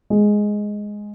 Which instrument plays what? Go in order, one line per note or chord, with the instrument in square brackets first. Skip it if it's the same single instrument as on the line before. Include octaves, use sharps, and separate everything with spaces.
[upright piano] G#3